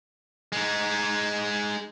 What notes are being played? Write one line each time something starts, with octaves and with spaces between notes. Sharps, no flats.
G#3 D#4